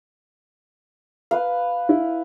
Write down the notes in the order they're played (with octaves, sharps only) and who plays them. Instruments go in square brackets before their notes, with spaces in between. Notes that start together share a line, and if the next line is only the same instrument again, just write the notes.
[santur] B4 F5
[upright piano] E4